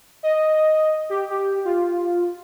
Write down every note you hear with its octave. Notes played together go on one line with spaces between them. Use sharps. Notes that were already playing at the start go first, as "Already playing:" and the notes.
D#5
G4
G4
F4